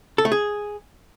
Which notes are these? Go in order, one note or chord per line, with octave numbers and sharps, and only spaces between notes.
A4
A3
G#4